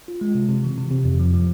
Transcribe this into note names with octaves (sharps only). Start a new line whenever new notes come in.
F4
G#3
C3
C3
E3
C3
C3
F2
F3
F3